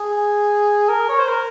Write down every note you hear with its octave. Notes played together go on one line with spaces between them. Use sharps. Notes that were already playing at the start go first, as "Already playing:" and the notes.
Already playing: G#4
A#4
C#5
C5
A#4